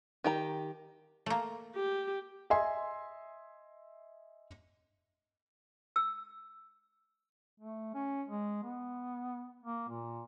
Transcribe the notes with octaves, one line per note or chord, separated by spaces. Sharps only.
D#3 G4 A#5
A3 A#3
G4
D#5 E5 G#5 C6
E6
A3
C#4
G#3
B3
A#3
A#2